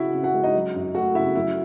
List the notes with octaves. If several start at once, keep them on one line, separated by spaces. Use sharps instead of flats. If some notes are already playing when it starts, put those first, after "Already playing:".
Already playing: C#3 C#4 E4 F#4 E5 F#5
C#3
F#4 F#5
G#3
D#4 D#5
F#3
F#2
A3 F#4 F#5
C#3 E4 E5
F#3 E4 E5